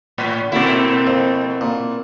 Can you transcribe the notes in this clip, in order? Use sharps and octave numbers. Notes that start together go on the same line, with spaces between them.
A2
B2 A3 A#3 C4 E4 F#4 D5
F2
A#2